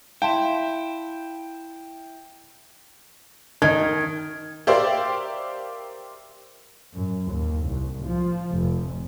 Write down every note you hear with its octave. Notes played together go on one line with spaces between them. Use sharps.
E4 E5 F5 G5 A5 C6
D#3 G#6
G4 A#4 C5 D5 E5 F5
F#2
D#2
C2
F3
F1